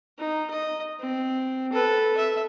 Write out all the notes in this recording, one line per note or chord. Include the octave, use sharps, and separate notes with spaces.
D#4
D#5
C4
A4 B4
E5